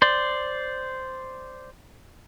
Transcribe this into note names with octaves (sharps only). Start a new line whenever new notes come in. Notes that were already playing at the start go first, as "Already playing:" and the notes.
C5 D5